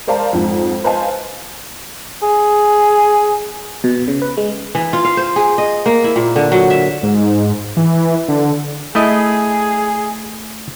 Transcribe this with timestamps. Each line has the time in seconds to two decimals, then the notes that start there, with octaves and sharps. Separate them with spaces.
0.07 A#4 C5 D5 F5 A5 A#5
0.33 F2 G#2
0.84 B4 C5 D#5 F5 G#5 A5
2.23 G#4
3.84 B2
4.08 C#3
4.22 B4
4.37 G#3
4.75 E3
4.93 F4
5.05 F5
5.17 C5
5.36 G#4
5.58 D#5
5.86 A#3
6.04 E4
6.16 A#2
6.36 D3
6.52 F#3
6.70 E5
7.03 G#2
7.77 E3
8.28 D3
8.95 A3 E4 G#4 D#5